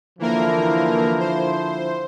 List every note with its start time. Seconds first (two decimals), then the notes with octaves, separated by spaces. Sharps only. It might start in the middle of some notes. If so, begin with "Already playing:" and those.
0.19 D3 E3 F3 A#3 E4 A#4
1.20 C5